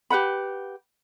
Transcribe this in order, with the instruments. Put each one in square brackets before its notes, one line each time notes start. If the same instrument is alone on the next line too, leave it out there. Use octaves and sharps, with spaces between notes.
[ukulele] G4 B4 F#5 B5